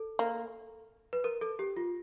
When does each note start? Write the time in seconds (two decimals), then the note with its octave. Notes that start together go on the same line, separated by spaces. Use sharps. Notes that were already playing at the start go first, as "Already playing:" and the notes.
Already playing: A4
0.19 A#3
1.13 B4
1.24 A#4
1.41 A4
1.59 G4
1.77 F4